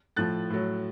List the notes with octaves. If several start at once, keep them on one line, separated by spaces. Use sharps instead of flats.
A2 F3 F#6 A6
A2 F#3